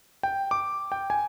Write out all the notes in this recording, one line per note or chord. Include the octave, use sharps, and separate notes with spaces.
G5
D6
G5
G#5